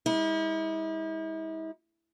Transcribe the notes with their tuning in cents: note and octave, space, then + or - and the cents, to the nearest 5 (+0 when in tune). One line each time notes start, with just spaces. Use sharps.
G#3 -35 E4 -40